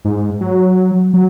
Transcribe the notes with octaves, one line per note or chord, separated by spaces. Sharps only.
G#2
F#3
F#3